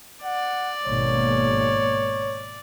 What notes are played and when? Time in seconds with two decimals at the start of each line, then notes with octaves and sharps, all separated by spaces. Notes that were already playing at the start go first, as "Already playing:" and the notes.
0.23 D5 F#5
0.85 G#1 B2 A#3 C#5